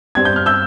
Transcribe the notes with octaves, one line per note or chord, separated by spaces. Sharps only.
G2 G3 C4 G#6
G6
F6
E6 G6